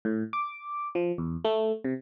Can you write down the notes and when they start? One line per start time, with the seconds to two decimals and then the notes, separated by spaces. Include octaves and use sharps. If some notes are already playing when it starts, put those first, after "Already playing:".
0.05 A2
0.33 D6
0.95 F3
1.18 E2
1.45 A3
1.84 C3